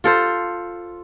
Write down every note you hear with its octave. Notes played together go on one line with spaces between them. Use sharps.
F4 A4 C5